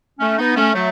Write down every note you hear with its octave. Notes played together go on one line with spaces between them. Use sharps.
A3 C#4
B3 D#4
A3 C#4
F#3 A3